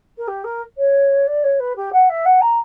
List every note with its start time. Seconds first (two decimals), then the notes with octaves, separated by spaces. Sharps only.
0.17 A#4
0.27 G4
0.44 A#4
0.78 C#5
1.27 D5
1.43 C#5
1.59 B4
1.76 G4
1.92 F#5
2.09 E5
2.25 F#5
2.41 A#5